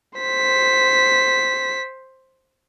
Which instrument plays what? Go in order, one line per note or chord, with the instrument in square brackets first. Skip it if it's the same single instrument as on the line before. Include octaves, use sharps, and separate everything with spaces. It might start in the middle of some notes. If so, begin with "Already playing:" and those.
[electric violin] C5 B6